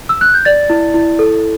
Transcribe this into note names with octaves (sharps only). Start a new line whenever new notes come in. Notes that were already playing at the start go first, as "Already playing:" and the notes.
E6
F#6
G6
D5 A6
E4
E4
A4